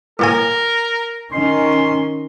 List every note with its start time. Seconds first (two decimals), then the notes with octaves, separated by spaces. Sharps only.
0.19 A2 A#3 A#4 G#5
1.32 D#3 C#4 C6